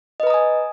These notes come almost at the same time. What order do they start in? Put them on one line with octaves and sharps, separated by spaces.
D#5 B4 A#5 D#6 G#5